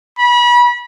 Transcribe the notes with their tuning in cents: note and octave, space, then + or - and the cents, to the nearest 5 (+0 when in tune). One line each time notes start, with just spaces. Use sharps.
B5 -30